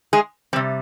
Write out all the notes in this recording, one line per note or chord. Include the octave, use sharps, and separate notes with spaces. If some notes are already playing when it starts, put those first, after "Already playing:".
G#3 G#4
C3 G3 C4